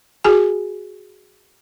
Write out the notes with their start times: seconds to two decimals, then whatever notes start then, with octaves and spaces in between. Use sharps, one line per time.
0.24 F#4 G#4 G#5